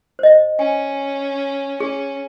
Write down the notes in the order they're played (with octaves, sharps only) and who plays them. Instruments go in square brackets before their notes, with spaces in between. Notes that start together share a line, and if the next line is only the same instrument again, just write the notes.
[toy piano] C5 D#5
[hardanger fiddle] C#4 [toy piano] G#5
[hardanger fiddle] C#4 [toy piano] G#4